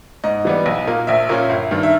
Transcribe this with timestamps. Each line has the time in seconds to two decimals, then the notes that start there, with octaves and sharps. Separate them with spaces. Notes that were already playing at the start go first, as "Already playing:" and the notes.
0.24 G#2 D#5
0.45 E3 G3 B3
0.66 B1
0.87 A#2 A#3
1.07 A#1 E5
1.29 A#2 A#3 C#4
1.49 G1
1.71 G2 D#3
1.83 E5